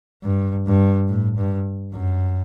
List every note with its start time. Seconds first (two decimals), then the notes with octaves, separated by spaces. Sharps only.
0.24 G2
0.67 G2
1.08 A2
1.36 G2
1.93 F#2